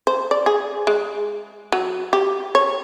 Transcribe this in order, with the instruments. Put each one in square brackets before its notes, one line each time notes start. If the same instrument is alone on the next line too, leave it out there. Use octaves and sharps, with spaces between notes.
[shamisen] C5
D5
G#4
G#3
F#3
G4
C#5